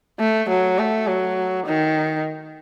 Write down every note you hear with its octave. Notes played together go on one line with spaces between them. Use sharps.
A3
F#3
A3
F#3
D#3